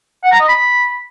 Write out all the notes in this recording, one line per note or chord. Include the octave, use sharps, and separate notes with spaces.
F#5
A#5
D#5
B5